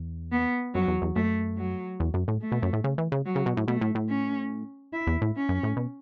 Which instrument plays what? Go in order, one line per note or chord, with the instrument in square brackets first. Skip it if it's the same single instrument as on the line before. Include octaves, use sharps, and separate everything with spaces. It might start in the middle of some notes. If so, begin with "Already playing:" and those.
Already playing: [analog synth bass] E2
[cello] B3
[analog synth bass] F#2 [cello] F#3
[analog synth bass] E2
E2
[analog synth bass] F#2 [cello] A3
[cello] F#3
[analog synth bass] E2
F#2
A2
[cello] A3
[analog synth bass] B2
F#2
A2
C#3
E3
C#3
[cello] F#3
[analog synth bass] C#3
B2
A2
[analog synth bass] B2 [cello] A3
[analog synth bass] A2
A2
[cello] C#4
E4
[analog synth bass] E2
A2
[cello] C#4
[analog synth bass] F#2
A2
B2